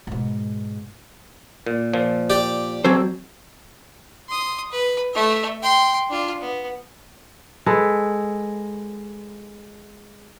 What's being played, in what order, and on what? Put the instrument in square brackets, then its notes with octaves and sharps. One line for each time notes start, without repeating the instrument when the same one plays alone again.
[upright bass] G#2 B2
[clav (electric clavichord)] A#2
A#2 F3
[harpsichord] G4 D5
[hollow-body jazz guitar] F#3 C4 C5 [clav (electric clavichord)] A4 C#5 G#5
[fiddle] C6 D#6
B4
A3 E5
G5 C6
D4 F4
B3
[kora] G#3 G#4 A4 B4